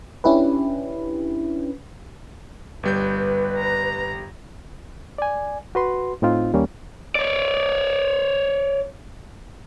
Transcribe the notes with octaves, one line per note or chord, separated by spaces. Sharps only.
C#4 D4 E4 G4 B4
G1 G3 B4 G6
A#5
D5 G#5
F#4 B4 C6
A2 C4 D#4 F4
D#2 G3 A#3 C#4
C#5 D5